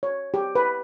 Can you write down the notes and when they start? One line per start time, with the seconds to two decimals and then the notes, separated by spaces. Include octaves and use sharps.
0.03 C#5
0.34 G4
0.55 B4